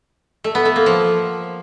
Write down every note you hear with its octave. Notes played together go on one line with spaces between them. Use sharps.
A3
B3
A3
A#3
F3